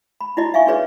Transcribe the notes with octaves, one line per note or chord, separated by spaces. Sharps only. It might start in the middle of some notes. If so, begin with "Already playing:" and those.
B5
D#4 E4 F#4 D5 D#5
E5 F5 G#5 C#6
D4 F#4 G#4 B4 C#5 D5